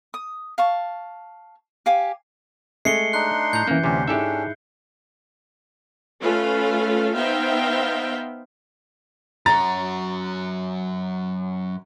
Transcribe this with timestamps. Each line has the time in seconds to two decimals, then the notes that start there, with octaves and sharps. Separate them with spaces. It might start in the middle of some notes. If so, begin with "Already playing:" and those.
0.14 D#6
0.58 F5 A5 C#6
1.86 G4 F5 G#5 D6
2.85 G#3 A3 C7 C#7 G7
3.13 D4 D#4 C6 F#6
3.53 A2 A#5 G6
3.67 F#2 E3 A#3
3.84 D2 C3 C#4 G4
4.08 G#2 C#4 D4 E4 G4 A4 E5
6.20 A3 C#4 F4 A4 B4 F5
7.15 B3 D#4 C5 E5 F5 G5
9.46 F#2 F#3 A#5 A6